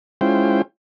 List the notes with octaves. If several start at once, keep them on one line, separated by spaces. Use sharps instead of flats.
G#3 C#4 E4 F4 C5 G5